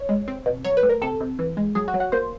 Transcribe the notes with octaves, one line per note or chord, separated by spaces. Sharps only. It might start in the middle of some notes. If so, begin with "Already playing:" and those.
Already playing: C#5
G#3
C4
B2
F#3 C#5
B4
A3
A#4
C3 A4
C3
E3
G#3
F#3 G#4
F#4
F#3
F#4
A#3 C5